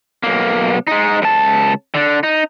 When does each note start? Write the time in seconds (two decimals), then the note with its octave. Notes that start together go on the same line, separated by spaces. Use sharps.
0.23 B1 A#3
0.87 G#3 D#4
1.22 C#2 A5
1.94 D3 D4
2.23 D#4